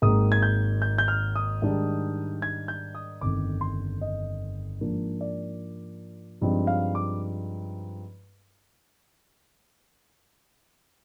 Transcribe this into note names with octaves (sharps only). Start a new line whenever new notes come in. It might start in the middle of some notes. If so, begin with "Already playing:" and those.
G#1 G#2 D#3 A#3 D#6
G#6
G6
G6
G6
F6
D#6
G#2 D#3 G3 D4
G#6
G6
D#6
G1 F2 D#3 D6
C6
D#5
G#2 F3 A#3 D4
D5
G2 F3 G#3 C4 D#4
F5
D6